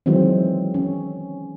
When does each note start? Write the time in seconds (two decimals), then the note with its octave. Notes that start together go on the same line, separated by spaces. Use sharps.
0.06 D#3 E3 F#3 G#3 C4
0.74 C#4